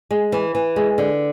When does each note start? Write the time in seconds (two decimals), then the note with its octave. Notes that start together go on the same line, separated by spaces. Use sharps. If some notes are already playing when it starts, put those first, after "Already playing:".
0.11 G#3
0.32 E3
0.55 E3
0.76 G#3
0.98 D3